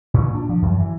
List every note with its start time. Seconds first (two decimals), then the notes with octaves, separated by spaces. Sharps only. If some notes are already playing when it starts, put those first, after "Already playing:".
0.14 A#2
0.35 D4
0.49 F3
0.62 F#2
0.79 E3